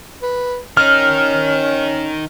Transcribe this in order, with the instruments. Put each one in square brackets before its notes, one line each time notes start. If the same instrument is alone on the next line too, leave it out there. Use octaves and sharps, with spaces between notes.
[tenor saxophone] B4
[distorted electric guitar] D#3 D#4 [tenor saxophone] C#4 [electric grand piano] F6